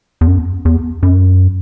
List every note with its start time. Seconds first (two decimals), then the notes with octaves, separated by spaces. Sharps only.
0.21 E2
0.27 F#2
0.65 E2
1.03 F#2